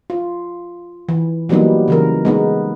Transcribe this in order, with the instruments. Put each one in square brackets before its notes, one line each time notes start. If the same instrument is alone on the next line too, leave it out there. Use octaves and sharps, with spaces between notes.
[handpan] F4
E3
E3 F#3 G3 A#3 B3 D#4
C#3 E3 A#4
G#3 B3 D#4